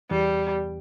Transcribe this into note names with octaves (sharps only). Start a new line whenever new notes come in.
E2 G3